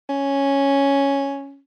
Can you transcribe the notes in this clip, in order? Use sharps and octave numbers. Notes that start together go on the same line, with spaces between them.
C#4